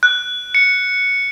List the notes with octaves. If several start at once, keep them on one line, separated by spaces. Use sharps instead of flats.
F#6
C#7